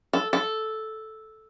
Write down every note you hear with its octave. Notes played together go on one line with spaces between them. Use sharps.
A4
A4